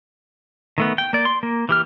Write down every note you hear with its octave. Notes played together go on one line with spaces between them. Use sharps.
D#3 A3 B3
G5
A#3 D5
C6
A#3
E3 G4 F6